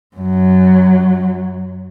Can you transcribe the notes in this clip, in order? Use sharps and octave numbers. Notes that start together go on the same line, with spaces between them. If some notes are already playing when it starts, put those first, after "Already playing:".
F#2 F#3